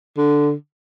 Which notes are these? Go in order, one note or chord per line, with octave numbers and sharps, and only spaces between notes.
D3